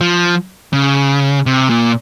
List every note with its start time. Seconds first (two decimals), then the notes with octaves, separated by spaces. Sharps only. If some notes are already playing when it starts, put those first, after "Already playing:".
0.01 F3
0.73 C#3
1.46 C3
1.70 A#2